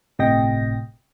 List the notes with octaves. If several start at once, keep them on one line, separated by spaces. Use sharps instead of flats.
G1 A2 C3 D#5 G5 A#6